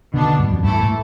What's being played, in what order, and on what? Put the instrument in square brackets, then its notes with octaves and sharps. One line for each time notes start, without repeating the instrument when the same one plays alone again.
[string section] B2 B3 D4 [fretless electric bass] D3
[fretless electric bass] D3
G2
F2
[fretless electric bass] G2 [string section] E3 A3 E4 A4
[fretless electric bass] A2